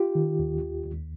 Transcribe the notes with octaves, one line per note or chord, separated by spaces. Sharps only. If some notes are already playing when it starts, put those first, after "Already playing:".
Already playing: F4 G4
D#3
D#2
D#2
D#2